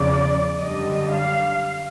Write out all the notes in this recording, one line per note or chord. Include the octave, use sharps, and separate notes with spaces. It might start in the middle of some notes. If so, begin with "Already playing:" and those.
Already playing: E2 C#3 F3 D5
F#2 D3 G3 D#5
F5